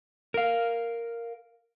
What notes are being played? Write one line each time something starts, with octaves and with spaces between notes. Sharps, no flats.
A#4 F5